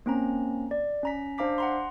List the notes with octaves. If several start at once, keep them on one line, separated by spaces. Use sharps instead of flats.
A#3 C4 C#4 A#5
D5
C#4 A#5 B6
D4 C5 F5 A#5 D6 B6
F#5 A#5 C6